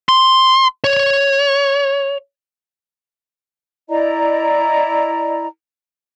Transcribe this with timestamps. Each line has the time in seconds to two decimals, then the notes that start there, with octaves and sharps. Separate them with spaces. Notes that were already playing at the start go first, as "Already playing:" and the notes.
0.09 C6
0.84 C#5
3.89 E4 D5 D#5 A#5